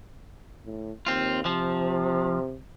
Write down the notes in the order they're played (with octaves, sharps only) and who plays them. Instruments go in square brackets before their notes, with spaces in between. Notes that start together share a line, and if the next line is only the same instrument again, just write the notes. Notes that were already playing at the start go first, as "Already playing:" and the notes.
[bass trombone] A2
[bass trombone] D#2 [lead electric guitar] C4 F4
[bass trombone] C3 [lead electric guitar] F3